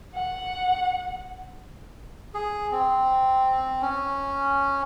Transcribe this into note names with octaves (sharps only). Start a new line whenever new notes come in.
F#5
G#4
C4
C#4